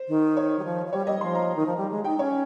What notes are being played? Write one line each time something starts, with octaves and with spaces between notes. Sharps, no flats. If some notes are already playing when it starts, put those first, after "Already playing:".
Already playing: C5
D#3
C#5
G3
F3
F3
G3 C#5
G3 D#5
F3 C6
A#5
D#3
F3
G3
G#3
D#4 G5
C#4 C#5